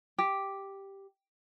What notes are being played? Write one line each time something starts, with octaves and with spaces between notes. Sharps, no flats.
G4